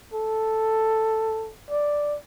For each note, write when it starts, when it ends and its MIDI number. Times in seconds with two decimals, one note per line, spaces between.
0.14 1.52 69
1.70 2.17 74